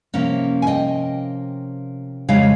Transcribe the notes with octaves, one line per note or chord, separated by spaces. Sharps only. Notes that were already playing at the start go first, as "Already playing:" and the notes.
C3 F3 A#3 C#4
G#5
D#5 G5
F2 C#3 G#3 C#5 F5